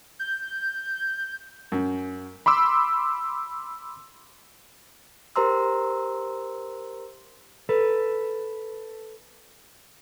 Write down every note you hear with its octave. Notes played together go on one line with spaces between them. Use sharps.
G6
F#2
B5 C6 D6 E6
G4 A#4 C5 A#5 C6 E6
A4 B4